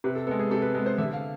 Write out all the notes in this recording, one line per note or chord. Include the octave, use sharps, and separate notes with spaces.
C3 B4
A4
G#3 B3 A4
G#4
C3 A4
B4
G#3 B3 B4
C5
D3 E5
F5